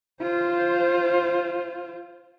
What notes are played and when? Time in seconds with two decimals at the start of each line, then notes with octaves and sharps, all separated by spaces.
0.22 F4 C5